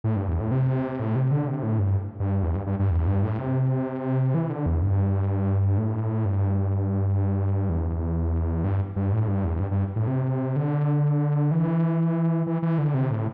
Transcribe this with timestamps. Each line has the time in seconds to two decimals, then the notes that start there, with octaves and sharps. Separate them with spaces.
0.04 A2
0.16 G2
0.28 E2
0.40 A2
0.51 C3
0.99 A2
1.16 C3
1.31 D3
1.48 C3
1.63 A2
1.79 G2
2.20 G2
2.43 E2
2.55 G2
2.66 G2
2.79 G2
2.90 E2
3.07 G2
3.23 A2
3.39 C3
4.34 E3
4.50 D3
4.66 E2
4.83 G2
5.78 A2
6.25 G2
7.69 E2
8.64 G2
8.96 G2
9.13 A2
9.28 G2
9.44 E2
9.60 G2
9.71 G2
9.96 A2
10.07 C3
10.56 D3
11.51 E3
12.47 E3
12.62 E3
12.78 D3
12.94 C3
13.10 A2